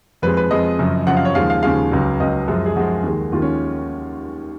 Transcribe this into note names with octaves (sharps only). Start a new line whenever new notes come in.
F2 F3 G#3 B4
B4
F2 F3 G#3 D#5
F#2 C#3 F3
F#2 C#3 F3 F#5
F5
C#5
D#2 C#3 F3 G#3 F5
F5
D#2 C#3 F3 G#3 F5
C#2 C#3 F#3
C#2 C#3 F#3 D#5
F#2 F3 G#3
G#4
F#2 F3 G#3 F#4
D#2 D#3 G#3
D#2 D#3 G#3 F4
C#4